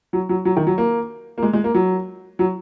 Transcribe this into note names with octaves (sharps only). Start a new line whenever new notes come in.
F#3
F#3
F#3
D#3
F#3
A#3
A#3
G#3
G#3
A#3
F#3
F#3